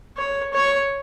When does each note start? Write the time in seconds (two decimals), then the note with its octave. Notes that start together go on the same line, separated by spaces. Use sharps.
0.17 C#5
0.53 C#5